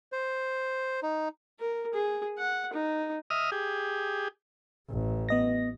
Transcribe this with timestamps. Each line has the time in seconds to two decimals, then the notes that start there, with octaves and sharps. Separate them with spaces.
0.12 C5
1.03 D#4
1.59 A#4
1.94 G#4
2.38 F#5
2.73 D#4
3.30 D#5 E5 D#6 F6
3.52 G4 G#4
4.90 A1
5.29 B3 D#5 A#6